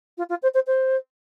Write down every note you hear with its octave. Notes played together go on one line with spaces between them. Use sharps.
F4
F4
C5
C5
C5